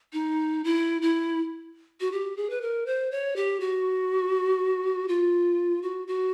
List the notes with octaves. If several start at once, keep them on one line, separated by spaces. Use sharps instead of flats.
D#4
E4
E4
F#4
G4
G#4
B4
A#4
C5
C#5
G4
F#4
F4
F#4
F#4